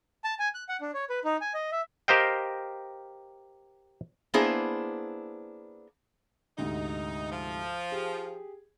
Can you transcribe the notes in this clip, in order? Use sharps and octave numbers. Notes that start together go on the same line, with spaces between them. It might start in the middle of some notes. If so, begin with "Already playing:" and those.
A5
G#5
F#6
F#5
D4
C#5
B4
D#4
G#5
D#5
E5
G4 A#4 C5 D#5 F5 G5
A#3 B3 D4 E4 G#4 C5
D2 G#2 C3 D#4
F3
G4 G#4